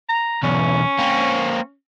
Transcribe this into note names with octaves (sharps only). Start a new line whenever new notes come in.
A#5
B1 E2 C#4
A#3 C4